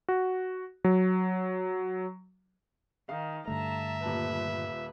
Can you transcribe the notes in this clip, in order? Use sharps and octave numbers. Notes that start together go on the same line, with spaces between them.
F#4
F#3
D#3 F5
G2 D3 A3 E5 A5 A#5
D#1 A#2 B4 A5